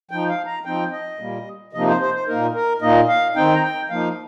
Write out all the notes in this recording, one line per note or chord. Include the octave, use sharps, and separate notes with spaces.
F3 D#4 G5
F5
A#5
F3 C4 D#4 G5
D#5
A#2 G3 A#3
C3 F3 A#3 D#4 D#5
C5
C5
C5
A#2 A#3 D#4 A#4
A#4
A#2 A#3 D#4 D#5
F5
D#3 C4 D#4 G5
A#5
G5
F3 A#3 D#4 F5